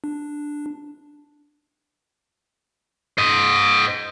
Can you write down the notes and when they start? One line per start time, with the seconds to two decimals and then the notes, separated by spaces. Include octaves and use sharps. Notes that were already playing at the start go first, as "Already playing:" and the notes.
0.04 D4
3.18 C5 D#5